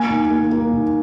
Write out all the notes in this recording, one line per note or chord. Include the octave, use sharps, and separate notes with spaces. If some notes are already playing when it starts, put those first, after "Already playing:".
Already playing: A#3 G#5
D#2
A#3
A#3
D#2